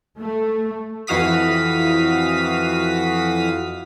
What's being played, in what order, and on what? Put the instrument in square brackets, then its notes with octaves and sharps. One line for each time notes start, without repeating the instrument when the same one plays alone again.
[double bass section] A3
[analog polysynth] F2 E3 F#4 F5 D#6 B6